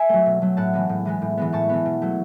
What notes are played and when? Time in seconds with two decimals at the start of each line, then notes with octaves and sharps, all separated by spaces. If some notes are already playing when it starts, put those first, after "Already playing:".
Already playing: E5 G#5
0.09 F#3 A3
0.26 B2
0.42 F#3 A3
0.57 A2 F#5 A5
0.73 E3 G#3 B3
0.89 A2
1.05 E3 G#3 B3
1.22 A2
1.37 E3 G#3 B3
1.53 A2 A5 C#6
1.69 E3 G#3 B3
1.86 B2
2.02 F#3 A3